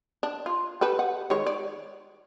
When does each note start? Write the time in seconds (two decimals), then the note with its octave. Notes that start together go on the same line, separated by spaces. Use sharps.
0.23 D4
0.46 F4
0.81 G4 A4 B4
0.99 F#5
1.30 D#3 G#3 C#5
1.46 D5